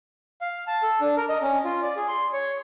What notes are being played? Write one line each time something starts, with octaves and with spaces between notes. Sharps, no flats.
F5
A5
A4
D4
A#4
D#5
C#4
F4
D5
G#4
C6
C#5